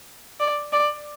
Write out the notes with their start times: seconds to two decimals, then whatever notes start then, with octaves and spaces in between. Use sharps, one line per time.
0.40 D5
0.73 D5